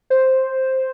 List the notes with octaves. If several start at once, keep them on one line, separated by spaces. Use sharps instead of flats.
C5